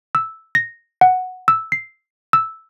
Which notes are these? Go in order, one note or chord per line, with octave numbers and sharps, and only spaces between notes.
E6
A#6
F#5
E6
C7
E6